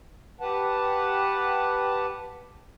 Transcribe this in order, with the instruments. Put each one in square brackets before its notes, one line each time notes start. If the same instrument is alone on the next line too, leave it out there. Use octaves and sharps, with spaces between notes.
[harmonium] G4 B4 F#5 A5